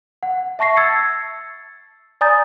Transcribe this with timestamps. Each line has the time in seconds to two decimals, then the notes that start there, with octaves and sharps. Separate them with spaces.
0.23 F#5
0.59 E5 A5 C#6 A#6 C7
0.77 E6 G#6 A6 C#7
2.21 D5 G#5 A#5 D#6 G6 A6